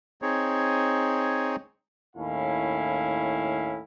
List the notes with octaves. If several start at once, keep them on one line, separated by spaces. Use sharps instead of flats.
C4 D#4 G#4 C#5
D#2 A2 C#4 E4 F5